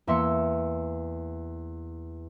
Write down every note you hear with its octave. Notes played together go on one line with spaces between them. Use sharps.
E2 A#3 E5 C6 E6 C#7